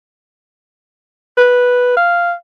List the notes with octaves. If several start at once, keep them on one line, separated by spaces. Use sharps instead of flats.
B4
F5